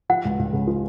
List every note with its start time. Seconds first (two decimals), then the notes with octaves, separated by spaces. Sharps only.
0.09 F3 F#5
0.25 C#2
0.39 C#2
0.53 C#3
0.67 F3